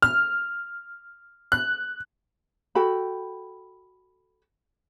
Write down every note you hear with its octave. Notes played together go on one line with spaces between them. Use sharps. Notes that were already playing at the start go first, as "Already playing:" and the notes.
F6
F#6
F#4 A4 G5 B5